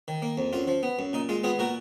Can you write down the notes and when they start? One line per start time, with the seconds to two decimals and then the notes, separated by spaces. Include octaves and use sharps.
0.08 D#3
0.22 A#3
0.38 F2
0.53 F#2 F4
0.68 F3
0.83 B3
0.99 F#2
1.13 A#2 D#4
1.29 G#3 F4
1.44 B3 F4 G#4
1.59 A#2 F#4 A#4